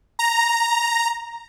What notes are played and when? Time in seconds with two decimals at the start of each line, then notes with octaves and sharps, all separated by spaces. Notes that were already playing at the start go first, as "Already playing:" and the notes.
0.19 A#5